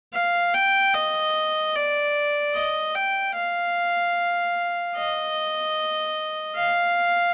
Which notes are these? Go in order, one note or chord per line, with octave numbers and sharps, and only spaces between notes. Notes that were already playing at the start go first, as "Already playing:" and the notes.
F5
G5
D#5
D5
D#5
G5
F5
D#5
F5